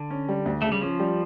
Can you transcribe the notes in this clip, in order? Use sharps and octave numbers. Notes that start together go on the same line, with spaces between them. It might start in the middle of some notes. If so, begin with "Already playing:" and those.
Already playing: D3
C#4
G3
D2
C#3 A3
G3
F3 C#4
G3